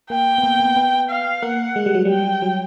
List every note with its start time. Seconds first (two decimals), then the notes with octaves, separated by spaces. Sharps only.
0.10 A#3 G5
0.38 B3
0.44 A#3
0.60 A#3
0.65 B3
0.76 B3
1.10 F5
1.42 A#3 F#5
1.76 G#3
1.86 G3
1.95 F#3
2.05 G3 G5
2.42 F#3